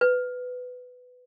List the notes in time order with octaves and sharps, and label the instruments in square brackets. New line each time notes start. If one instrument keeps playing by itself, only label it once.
[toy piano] B4